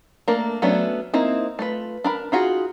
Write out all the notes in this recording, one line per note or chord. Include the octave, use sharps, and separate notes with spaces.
A3 A#3 D4 A#4
F#3 A3 B3 C#4 D4
A#3 C4 D#4 E4
A3 F4 B4
D4 A#4 B5
D#4 F4 F#4 G#4